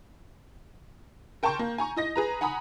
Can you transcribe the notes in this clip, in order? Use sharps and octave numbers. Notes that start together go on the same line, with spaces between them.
A#4 G5 A5 C6 C#6 G6
A#3
G#5 A#5 C#6
E4 D#5 A#6
G#4 B4 A#5
F#5 G#5 A#5 B5 D#6